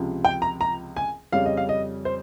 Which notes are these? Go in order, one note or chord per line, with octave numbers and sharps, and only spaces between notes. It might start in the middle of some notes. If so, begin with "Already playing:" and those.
Already playing: C#2 C3 F3
G5
A#5
A#5
G#5
F2 C#3 G3 C#4 F5
D#5
F5
D#5
C5